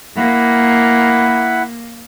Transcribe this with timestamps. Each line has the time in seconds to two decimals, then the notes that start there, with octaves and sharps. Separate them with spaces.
0.17 A#3 E4 F#5 B5